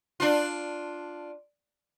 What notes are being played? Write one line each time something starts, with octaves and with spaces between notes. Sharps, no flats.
D4 F4